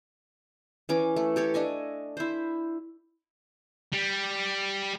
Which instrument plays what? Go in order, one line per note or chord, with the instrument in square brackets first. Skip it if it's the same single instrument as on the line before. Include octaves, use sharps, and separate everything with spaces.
[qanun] E3 C#4 D6
A3
G4 A4 C#5
A3 D4 D#5 G#5
E4 C5
[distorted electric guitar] G3